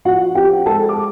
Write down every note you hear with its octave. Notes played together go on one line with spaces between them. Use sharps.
F3 F#4 F#5
C4 G4 G5
G#3 A4 A5
D6